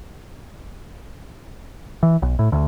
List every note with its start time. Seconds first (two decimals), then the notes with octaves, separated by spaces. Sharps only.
2.03 E3
2.22 B1
2.39 A2
2.52 D2